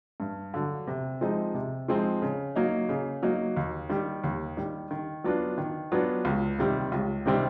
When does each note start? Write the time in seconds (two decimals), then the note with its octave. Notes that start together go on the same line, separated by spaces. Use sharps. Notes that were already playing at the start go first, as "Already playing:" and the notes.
0.20 G2
0.54 D3 F#3
0.87 C3
1.21 F3 G#3 C4 D#4
1.55 C3
1.88 F3 G#3 C4 D#4
2.22 C#3
2.56 F#3 A#3 D#4
2.89 C#3
3.23 F#3 A#3 D#4
3.57 D#2
3.89 D#3 G3
4.24 D#2
4.57 D#3 G3
4.91 D#3
5.24 F#3 B3 D4 F4
5.58 D#3
5.92 F#3 B3 D4 F4
6.25 C#2
6.59 C3 D#3 G3 C4
6.92 C#2
7.26 C3 D#3 G3 C4